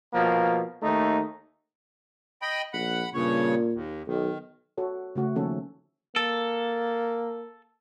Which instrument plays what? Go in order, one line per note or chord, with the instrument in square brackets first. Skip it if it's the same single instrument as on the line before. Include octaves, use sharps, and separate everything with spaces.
[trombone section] B2 F3 A#3
D#2 A3 D#4
[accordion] D#5 G5 B5
[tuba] A#1 [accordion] F#5 B5
[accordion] G2 C#3 C#5 [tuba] A#2
[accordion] D#2
[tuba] B1 [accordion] D#3
[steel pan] F#4 A4 C#5
C#3 A3 F#4
D#3 F3 A#3 C#4 A4 C#5
[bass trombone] A#3 [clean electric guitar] A4